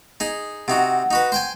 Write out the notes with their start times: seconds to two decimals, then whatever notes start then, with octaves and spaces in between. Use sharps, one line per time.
0.20 D#4 G#4
0.68 C3 D#4 F#4 F#5
1.11 D#4 F#4 B4
1.32 C5 G5 G#5